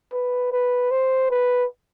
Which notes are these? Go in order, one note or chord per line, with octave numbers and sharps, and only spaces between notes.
B4
B4
C5
B4